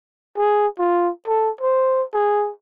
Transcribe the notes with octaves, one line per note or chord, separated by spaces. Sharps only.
G#4
F4
A4
C5
G#4